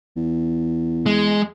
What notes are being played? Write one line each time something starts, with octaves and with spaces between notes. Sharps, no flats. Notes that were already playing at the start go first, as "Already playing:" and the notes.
E2
G#3